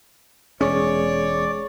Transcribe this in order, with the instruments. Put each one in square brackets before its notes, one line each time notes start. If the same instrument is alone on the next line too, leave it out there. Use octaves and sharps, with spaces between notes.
[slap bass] E1 C#4 [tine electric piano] G#3 G#4 [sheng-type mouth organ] C#5 [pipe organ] D5